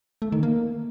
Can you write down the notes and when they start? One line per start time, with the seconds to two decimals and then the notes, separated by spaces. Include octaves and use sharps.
0.22 A3
0.32 D#3
0.43 A#3